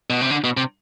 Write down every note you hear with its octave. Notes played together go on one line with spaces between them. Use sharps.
B2
C3
D3
B2
C3